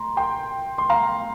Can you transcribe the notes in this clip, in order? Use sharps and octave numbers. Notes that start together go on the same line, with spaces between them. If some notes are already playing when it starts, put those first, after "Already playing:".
Already playing: A#5 C6
G5 C6
C6
F5 A#5